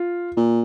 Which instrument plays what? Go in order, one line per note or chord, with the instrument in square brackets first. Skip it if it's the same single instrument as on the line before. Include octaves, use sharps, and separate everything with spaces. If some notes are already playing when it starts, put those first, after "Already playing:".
Already playing: [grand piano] F4
[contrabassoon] A#2